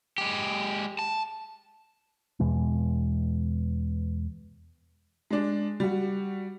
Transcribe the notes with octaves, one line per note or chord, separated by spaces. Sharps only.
G#3 G4
A5
E2 B2 E3 G#3
G#3 D4
G3 F#4